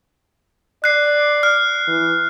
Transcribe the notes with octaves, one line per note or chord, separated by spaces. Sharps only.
D5 F#6 C7
F6
E3